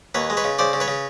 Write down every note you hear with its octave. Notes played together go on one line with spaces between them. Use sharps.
D#2 B4 C#5
G#3
B4 C#5
C#3
C#3 C5 D5
C#3
B4 C#5
C#3